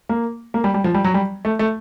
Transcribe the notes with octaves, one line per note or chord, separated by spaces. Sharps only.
A#3
A#3
G3
G3
F3
G3
F#3
G3
A3
A3